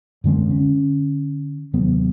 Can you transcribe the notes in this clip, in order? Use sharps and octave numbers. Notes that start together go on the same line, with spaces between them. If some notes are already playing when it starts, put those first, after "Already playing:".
F#2 D3 G#3 C4
D3 C#4
D#2 C3 F#3 B3